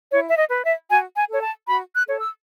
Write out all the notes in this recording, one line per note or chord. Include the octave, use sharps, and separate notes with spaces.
E4 C#5
E5
D#5
B4
E5
F#4 G#5
G#5
A4 C#5
A5
F#4 B5
F#6
A4 C#5
E6